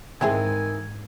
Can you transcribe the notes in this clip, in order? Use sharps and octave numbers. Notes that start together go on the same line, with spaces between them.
G#2 D#3 E3 G#3 C4 E4 G#4 G#5